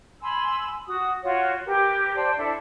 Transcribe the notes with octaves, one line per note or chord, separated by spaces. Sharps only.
G#5 B5 C6 E6
F#4 D#6
F4 F#4 C#5
G4 A#4 B4
C5 D5 G5 A5
D4 E4 A4